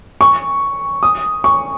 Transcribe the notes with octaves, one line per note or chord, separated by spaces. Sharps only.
C#6
D#6
C#6